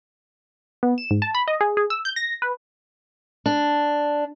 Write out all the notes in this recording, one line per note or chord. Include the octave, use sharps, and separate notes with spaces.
B3
E7
G#2
A5
B5
D#5
G#4
G#4
E6
G6
A#6
B4
D4